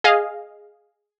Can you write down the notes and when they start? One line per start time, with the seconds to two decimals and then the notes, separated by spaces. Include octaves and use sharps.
0.04 G#4 D#5 F5